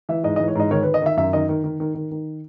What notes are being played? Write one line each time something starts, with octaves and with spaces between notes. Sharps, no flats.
E3 E5
G#2 D#5
D#5
E3
C#5
G#2 D#5
D#3 C#5
B4
D#3
D#5
D#3 E5
F#2 E5
D#3 D#5
D#3
D#3
D#3
D#3
D#3